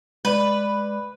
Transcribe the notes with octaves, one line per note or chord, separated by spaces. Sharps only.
G#3 B4 D5